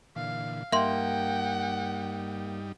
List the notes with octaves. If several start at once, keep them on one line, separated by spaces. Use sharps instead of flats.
A#2 D3 E3 F5
G2 G3 A#3 D#4 E5 F#5 G5 C6